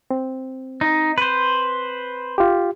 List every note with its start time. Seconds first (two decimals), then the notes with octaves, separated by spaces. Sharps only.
0.11 C4
0.81 D#4
1.18 B4 C5
2.38 F4 G4